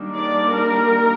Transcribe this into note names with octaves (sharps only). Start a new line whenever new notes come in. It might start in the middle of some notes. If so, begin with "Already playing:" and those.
Already playing: D#3 G3 A#3 D4
D5
A#4